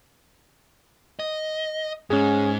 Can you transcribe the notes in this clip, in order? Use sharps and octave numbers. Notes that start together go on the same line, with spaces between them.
D#5
G#2 C#4 G#4